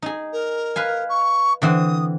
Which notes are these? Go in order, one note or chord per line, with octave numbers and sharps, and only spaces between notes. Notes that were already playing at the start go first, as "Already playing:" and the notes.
D#4 G#4
A#4
B4 F5 G#5
C#6
D3 E3 C4 D#6